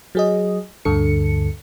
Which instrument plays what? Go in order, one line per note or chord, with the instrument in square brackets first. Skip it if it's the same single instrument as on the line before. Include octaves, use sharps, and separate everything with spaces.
[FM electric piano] F#3 G#4 D#5
D2 G2 D3 A4 C#7